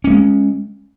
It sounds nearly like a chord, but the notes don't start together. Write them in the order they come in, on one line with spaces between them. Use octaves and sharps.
C#4 A#3 G#3